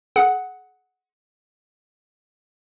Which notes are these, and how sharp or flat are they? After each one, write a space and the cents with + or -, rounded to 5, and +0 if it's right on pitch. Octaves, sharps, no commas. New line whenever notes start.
G#4 +30 F#5 +0